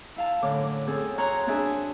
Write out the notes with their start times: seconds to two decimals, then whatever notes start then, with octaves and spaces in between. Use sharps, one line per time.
0.16 E4 F5 A5
0.42 F#2 A2 D3 D6
0.87 C4 G#4 A4
1.18 F#4 C#5 A#5 C6 F#6
1.47 C4 D4 F#4 G#4 E5 G#5